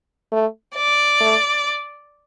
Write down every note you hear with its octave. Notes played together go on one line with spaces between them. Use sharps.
A3
D5
A3